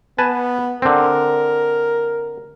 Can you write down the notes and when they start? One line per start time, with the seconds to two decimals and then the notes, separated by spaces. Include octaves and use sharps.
0.18 B3 B4 G#5 A5
0.82 D3 C4 A#4